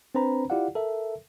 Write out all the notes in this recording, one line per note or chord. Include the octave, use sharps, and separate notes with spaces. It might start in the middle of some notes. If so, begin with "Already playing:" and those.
C4 D4 B4 C5 A#5 B5
E4 F4 G4 D5 F5 F#5
A4 A#4 E5